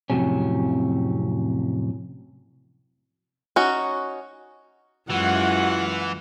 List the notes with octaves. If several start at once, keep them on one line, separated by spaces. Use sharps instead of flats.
F2 A2 C3 F#3 C#4
C#4 D#4 F#4
F#2 E3 G#3 F4 F#4 F#5